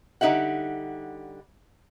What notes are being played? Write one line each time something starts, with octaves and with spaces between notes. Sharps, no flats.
D3 G3 D#4 G4 E5 F#5